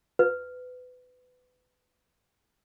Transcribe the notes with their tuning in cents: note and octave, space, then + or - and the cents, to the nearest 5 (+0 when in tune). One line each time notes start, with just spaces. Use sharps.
B4 +25